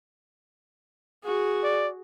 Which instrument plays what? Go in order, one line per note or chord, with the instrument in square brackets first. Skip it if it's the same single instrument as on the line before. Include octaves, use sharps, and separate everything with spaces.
[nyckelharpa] F#4 G#4
[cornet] D5